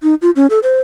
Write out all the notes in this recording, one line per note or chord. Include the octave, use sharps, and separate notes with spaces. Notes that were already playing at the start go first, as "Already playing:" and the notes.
D#4
F4
C#4
A4
C5